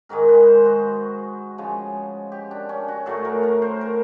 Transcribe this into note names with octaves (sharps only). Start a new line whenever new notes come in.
G#2 D#3 G#3 A#4
B4
C5
F#4
C#3 F3 G#3
G4
D4
C#4
F#4
A2 F#3 A3 A4
A#4
A#4
C5
A#4